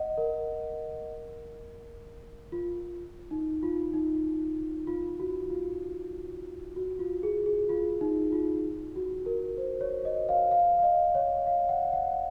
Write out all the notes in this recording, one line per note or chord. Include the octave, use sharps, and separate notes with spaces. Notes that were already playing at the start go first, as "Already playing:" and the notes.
Already playing: D#5 F#5
A#4
F4
D#4
F4
D#4
F4
F#4
F4
F#4
F4
G#4
G#4
F4
D#4
F4
F#4
A#4
C5
C#5
D#5
F5
F5
F5
D#5
C#5
F5
F#5
F#5